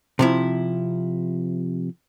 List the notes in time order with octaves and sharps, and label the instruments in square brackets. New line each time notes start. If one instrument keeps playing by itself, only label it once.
[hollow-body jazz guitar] C3 F3 E4